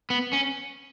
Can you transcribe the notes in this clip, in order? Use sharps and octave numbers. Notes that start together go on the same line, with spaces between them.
B3
C#4